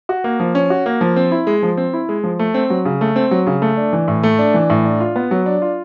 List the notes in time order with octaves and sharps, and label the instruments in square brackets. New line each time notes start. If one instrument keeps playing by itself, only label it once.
[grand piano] F#4
A#3
F3
C#4
F#4
A#3
F3
C4
E4
G#3
F3
C4
E4
G#3
F3
A3
C4
F#3
C#3
A3
C4
F#3
C#3
A3
D4
E3
A2
A3
D4
E3
A2
D4
F4
B3
F#3
D4
F4